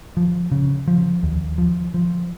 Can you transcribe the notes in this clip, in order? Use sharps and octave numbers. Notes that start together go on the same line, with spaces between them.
F3
C#3
F3
D#2
F3
F3